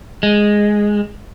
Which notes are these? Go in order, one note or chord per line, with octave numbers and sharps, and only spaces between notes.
G#3